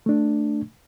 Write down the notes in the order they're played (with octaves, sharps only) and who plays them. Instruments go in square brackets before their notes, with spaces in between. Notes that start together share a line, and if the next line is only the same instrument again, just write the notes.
[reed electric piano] A3 D4